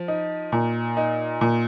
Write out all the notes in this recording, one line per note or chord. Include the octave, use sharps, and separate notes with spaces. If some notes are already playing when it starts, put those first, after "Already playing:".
Already playing: F3
D#4
A#2
D#4
A#2